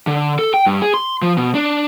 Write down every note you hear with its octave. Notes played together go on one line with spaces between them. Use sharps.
D3
A4
G5
G2
G#4
C6
F3
B2
D4